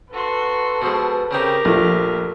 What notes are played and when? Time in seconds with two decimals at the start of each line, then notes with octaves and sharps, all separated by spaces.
0.13 F#4 A4 B4 C6
0.82 B2 F3 G#3
1.31 C#3 C4 D#4 G4 A#4
1.65 A#1 F3 A3